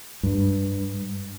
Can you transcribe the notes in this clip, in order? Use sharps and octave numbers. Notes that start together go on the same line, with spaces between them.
G2